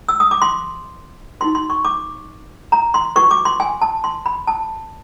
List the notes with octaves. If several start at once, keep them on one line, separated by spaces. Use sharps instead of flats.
E6
D#6
D6
C6
D#4 F#4 B4 C6
C6
C#6
D6
A#5
C6
F#4 B4 C#6
D6
C6
G#5
A5
C6
B5
A5